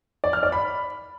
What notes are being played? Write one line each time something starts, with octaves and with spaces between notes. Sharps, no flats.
D5
F6
D5
B5